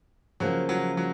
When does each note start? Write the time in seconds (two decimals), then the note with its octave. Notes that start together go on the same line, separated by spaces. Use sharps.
0.40 C#3 F3 F#3 A#3
0.69 F#3
0.97 F#3